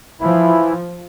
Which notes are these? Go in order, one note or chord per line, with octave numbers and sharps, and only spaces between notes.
E3 F3 E4